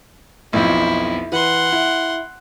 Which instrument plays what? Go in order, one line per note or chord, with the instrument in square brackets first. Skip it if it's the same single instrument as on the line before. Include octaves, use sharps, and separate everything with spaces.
[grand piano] B1 F2 F3 [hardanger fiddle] E4
[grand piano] E3 B4 [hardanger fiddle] F#5 C6
[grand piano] E4